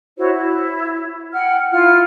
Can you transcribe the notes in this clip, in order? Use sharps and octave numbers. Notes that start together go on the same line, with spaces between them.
E4 F#4 C5 C#5
E4
F#5 G5 F6
E4 F4 F6